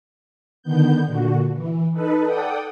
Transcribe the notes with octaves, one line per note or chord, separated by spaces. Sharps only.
D3 D#3 B3 G6
A#2 D3 F#4
E3
D#4 A4 B4
A4 D5 F#5 G5 D#6